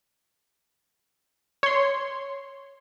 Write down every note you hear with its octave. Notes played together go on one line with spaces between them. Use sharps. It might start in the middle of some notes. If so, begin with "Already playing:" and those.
C#5 C6